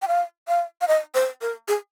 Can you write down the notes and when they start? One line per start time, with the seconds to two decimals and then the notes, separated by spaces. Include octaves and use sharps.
0.02 G5
0.08 F5
0.48 F5
0.81 F5
0.88 D#5
1.15 C5
1.42 A#4
1.68 G#4